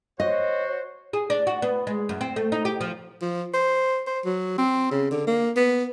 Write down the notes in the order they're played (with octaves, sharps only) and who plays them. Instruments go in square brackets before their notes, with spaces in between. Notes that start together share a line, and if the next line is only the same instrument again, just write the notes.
[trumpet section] F#4 C5 [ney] C#5 [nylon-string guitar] D#5
[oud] G#4
D4
F#4
B3
G#3
F#2
C4
A3
D#4
G4
F3
[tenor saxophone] F3
C5
C5
F#3
C4
C#3
D3
A#3
B3